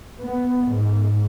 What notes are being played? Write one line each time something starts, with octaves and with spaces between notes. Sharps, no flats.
B3
G#2